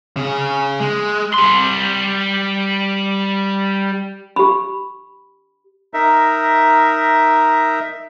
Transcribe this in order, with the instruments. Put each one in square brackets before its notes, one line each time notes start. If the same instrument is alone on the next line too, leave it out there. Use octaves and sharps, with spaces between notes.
[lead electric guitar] C#3 G#4
G#3
[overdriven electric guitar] G3 C6
[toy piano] G4 B5
[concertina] D#4 A#4 E5